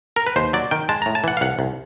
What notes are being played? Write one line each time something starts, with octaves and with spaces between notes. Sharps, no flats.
A#4
B4
D#2 C5
F#3 D5
D#3 G5
G#3 A5
A2 A#5
A5
E3 F#5
F5
C2 F#5
C2